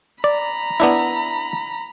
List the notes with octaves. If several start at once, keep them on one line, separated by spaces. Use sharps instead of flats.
D5 A#5 B5
B3 D4 E4